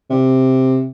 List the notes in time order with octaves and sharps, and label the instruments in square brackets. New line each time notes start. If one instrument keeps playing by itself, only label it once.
[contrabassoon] C3